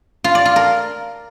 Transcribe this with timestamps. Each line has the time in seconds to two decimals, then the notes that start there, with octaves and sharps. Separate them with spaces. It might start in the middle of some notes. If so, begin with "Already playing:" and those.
0.24 F4
0.35 D5
0.45 F4
0.56 A#4